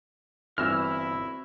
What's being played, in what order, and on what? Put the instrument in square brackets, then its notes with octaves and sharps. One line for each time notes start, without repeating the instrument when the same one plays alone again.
[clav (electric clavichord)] G1 E3 [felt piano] C4 F#4 A#6 [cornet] E4 [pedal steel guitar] E6 F6